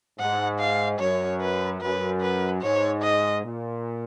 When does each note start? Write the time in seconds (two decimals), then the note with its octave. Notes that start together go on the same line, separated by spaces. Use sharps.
0.18 G#2 F#5
0.59 F5
0.99 F#2 C#5
1.41 B4
1.81 F#2 B4
2.21 B4
2.62 G#2 C#5
3.02 D#5
3.43 A#2